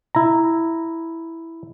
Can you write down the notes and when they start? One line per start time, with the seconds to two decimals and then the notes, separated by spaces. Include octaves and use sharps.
0.15 E4 A#5